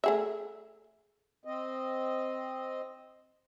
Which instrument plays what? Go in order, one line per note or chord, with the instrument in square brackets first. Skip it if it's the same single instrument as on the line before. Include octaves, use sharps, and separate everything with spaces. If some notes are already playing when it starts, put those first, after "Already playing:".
[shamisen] A3 G#4 E5
[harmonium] C4 D#5